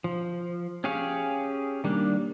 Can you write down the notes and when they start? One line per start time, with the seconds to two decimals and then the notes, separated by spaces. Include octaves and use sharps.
0.04 F3
0.84 C#4 G4 G#4 C#5 F5
1.84 D#3 G3 A#3 D4